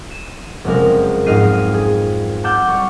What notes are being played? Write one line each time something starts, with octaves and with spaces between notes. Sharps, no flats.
D#7 E7
F#1 F2 C3 G#3 A#4
F2 G#2 D#5 F6 C7 D#7
G#4
F#5 A5 D6 E6 F6 G6
G3 C#6